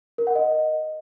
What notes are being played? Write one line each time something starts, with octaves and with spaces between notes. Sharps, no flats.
A#4
F#5
D#5